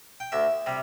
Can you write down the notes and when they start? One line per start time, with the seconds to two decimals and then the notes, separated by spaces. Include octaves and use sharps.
0.20 G5
0.32 D2 E5
0.66 C3 G3